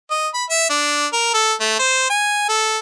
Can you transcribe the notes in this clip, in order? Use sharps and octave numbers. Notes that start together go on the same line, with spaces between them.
D#5
B5
E5
D4
A#4
A4
A3
C5
G#5
A4